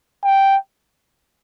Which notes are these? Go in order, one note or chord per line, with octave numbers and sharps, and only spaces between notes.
G5